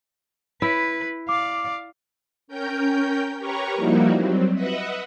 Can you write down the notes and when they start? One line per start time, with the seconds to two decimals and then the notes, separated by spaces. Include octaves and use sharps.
0.62 E4 B4
1.29 D5 F5 D6
2.48 C#4 A#4 G5 G6
3.38 G4 A#4 B4 C#5 A#5 C#6
3.75 F3 G3 A#3 D#4 E4 F#4
4.12 F#3 G3 C4
4.54 B4 D#5 E5 F#5